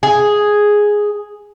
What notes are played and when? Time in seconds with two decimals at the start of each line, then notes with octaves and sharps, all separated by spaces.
0.03 G#4